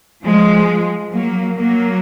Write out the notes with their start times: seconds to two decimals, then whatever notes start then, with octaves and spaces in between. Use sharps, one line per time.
0.24 F3 G#3
1.13 F#3 A#3
1.57 F#3 A#3